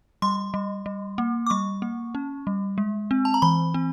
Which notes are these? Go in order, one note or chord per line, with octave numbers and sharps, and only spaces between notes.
G3 C6
G3
G3
A#3
D6
G3 C#6
A#3
C#4
G3
G#3
C4
A5
A#5
E3 B5
C4